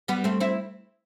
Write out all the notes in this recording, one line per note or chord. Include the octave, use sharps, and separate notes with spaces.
G3 B3
A3 C4
C4 E4